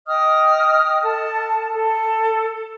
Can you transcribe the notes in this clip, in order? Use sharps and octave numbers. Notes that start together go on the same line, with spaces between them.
D#5 G5 D#6 F6
A4 A5
A4